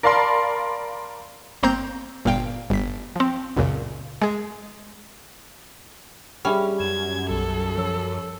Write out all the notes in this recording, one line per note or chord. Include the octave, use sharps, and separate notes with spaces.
A#4 D5 F5 A5 B5 C6
G1 A#3 C4 A#5 C6 G6
G1 A#2 F5 G5
G1 B6
F3 C4
C#2 F#2 A#2 C#3
G#3 G#4
G3 C#4 G#4 E5 B5
F#2 G#6 E7
B1 A4
F3 C#5 E6